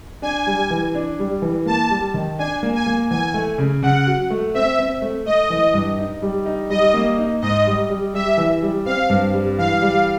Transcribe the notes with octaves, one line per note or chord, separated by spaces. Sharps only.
D4 G#5
G3
E3
D4
G3
E3
A#3 A5
G3
D#3
D4 G#5
A#3
G#5
A#3
E2 G#5
A3
C#3
C#3 F#5
F#3
A3
C4 E5
C4
A3
A3 D#5
E3
G2
D#4
G3
D#4
G3 D#5
A#3
D#4
G#2 D#5
G3
G3
G3 E5
E3
G3
C4 F5
G2
G3
E3 F5
G3